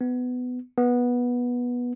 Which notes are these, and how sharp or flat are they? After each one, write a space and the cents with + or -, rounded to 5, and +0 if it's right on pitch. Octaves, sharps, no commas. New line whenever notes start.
B3 +15
B3 -15